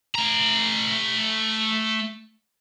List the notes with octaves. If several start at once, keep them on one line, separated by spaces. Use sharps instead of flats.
A3 A#5